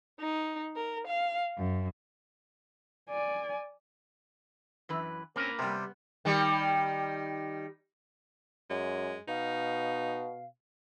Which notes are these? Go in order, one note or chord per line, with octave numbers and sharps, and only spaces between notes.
D#4
A#4
F5
F#2
D5 G#5
F#2 E3 B4
A#3 C4 C#4 A#4 B4
C3 G3 B3
D#3 G3
F#2 G#3
B2 D#4 F5